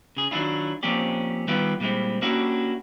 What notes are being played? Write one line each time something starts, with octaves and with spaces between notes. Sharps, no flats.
C#3 G#4
D#3 F#3 D4 E4 F4
F3 A#3 C4 C#4 G4 D5
D#3 G3 B3 E4 F4 G4
A#2 G3 G#3 C4 E4
A#3 C#4 D4 E4 F#4 G4